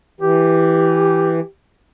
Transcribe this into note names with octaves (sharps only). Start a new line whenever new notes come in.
E3 G4